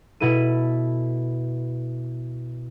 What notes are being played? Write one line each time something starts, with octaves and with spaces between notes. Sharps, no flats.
B2 E4 A4 D#7